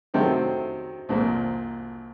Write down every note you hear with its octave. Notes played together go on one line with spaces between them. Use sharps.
C3 D#3 F#3 A3 C4
C2 A#2 F3